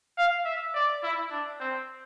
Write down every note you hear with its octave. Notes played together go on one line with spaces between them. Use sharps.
F5
E5
D5
E4
D4
C4